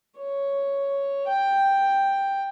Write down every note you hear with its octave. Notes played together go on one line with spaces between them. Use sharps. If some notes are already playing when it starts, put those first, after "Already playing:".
C#5
G5